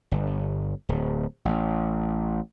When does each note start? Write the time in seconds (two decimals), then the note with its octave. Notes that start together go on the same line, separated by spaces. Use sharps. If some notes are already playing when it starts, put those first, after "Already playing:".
0.11 G1
0.89 D1
1.45 A1